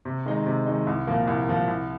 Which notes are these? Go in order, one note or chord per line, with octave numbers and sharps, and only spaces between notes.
C3
D#3 G#3 D#4
C3
D#3 G#3 D#4
C2
A#2 F3 A#3
C2
A#2 F3 A#3
C2